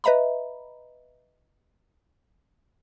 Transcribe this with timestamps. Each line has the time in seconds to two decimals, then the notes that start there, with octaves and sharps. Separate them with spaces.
0.04 B4 D#5 E5 A#5 B5